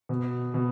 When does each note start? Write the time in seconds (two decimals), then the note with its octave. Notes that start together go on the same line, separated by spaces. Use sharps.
0.09 B2
0.54 B2